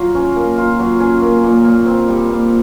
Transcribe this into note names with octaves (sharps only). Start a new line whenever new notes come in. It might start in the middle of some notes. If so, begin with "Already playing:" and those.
Already playing: F#3 F4
C#4
A#3
F4
F#3
C#4
A#3
A#2
A#2
C4
G3
A#2